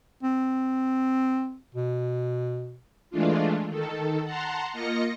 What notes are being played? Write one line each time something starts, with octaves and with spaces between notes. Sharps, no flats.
C4
B2
E3 G#3 A3 D4 F4
D#3 A4
F#5 A5 A#5 C6
A#3 F4 D#5 A#6 C#7